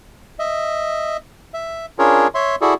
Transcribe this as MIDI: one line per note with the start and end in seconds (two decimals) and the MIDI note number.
0.39 1.17 75
0.39 1.17 76
1.54 1.86 76
1.99 2.28 61
1.99 2.28 62
1.99 2.28 65
1.99 2.28 68
1.99 2.28 70
1.99 2.28 73
2.35 2.55 73
2.35 2.55 76
2.35 2.55 84
2.61 2.74 64
2.61 2.74 66
2.61 2.74 68
2.61 2.74 69
2.61 2.74 74